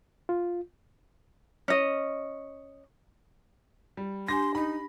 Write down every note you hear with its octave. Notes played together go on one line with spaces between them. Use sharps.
F4
C#4 D#5
G3
D4 G4 G#5 C6 A#6
D#4 B5